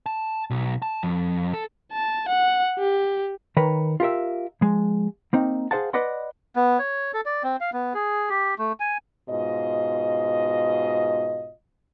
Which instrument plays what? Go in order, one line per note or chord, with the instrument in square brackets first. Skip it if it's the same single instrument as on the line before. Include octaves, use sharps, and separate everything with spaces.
[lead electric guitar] A5
B1
A5
F2
A4
[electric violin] A5
F#5
G4
[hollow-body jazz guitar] D#3 A#4 B4 C#5
F4 G4 A#4 E5
F3 G#3
A#3 C4 D#4
G#4 C5 F5 F#5 A5
B4 D5 D#5 F#5 C6
[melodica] B3
C#5
A4
D5
C4
F5
B3
G#4
G4
A3
G#5
[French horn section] G#2 B2 F4 D#5